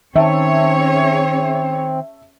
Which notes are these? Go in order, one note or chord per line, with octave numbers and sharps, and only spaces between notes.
D#3 C4 C#4 G#4 C#5 E5 A5